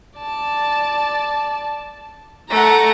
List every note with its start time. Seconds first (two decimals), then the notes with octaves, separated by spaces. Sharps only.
0.19 D5 A5
2.50 A3 F#5 A#5 A#6